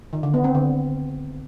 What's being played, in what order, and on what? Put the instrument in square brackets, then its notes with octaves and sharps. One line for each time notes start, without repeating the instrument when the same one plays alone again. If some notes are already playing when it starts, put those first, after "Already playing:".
[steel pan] D#3
D3
B3
C4
D3